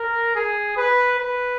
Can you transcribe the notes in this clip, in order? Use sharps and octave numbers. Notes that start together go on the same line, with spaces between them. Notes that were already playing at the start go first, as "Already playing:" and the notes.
Already playing: A#4
G#4
B4
B4